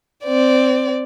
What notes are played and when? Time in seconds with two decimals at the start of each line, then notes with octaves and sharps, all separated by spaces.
0.24 C4 D5